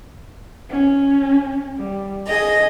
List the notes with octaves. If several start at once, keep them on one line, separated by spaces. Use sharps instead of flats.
C#4
G3
G#4 D#5